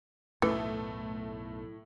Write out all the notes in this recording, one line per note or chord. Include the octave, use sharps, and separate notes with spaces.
B1 F#2 A2 E3 A3